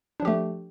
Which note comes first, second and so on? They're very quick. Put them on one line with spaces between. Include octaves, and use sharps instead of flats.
D4 F3 G4 A3